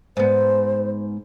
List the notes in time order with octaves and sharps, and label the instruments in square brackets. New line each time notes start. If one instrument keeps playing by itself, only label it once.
[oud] G#2 B3 [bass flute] C5